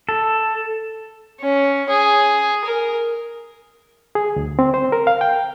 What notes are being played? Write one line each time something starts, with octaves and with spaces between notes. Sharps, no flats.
A4
C#4
G#4
A#4
G#4
D2
C4
C5
A#4
F5
G5